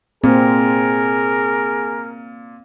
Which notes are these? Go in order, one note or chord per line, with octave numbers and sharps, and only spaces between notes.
A#2 C4 G#4 A#4